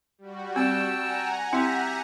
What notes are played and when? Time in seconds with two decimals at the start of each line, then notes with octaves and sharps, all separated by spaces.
0.18 G3 F#4
0.56 C4 G5 A5 E6
0.97 F#5 G#5 A#5
1.53 C4 E4 G4 E5